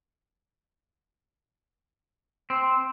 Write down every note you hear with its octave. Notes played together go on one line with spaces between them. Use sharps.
C4